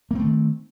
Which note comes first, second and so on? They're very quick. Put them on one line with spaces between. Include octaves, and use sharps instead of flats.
A#3 C4 A3 D#3